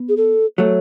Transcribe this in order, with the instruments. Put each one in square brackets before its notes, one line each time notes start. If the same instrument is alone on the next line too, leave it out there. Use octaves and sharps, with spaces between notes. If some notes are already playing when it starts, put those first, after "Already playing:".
Already playing: [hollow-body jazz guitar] B3
[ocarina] G#4
A4
[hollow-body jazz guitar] F#3 A3 [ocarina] C#5